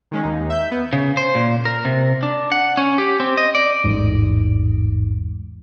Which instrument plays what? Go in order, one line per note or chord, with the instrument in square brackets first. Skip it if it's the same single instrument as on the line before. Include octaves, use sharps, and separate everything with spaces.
[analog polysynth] D#3 G#3 C#4
D#2 D#4
E5 G6
B3
[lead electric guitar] C#3
C5
A#2
A#4
C3
D4
F#5
C#4
G4
C4
D#5
D5
[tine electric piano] A1 E2 G#2